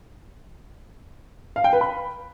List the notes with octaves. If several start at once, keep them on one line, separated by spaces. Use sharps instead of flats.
F5
G5
B4
B5